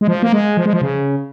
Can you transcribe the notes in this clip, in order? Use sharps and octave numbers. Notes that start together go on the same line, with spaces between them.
G#3
F3
A#3
G#3
F3
G#3
F3
C#3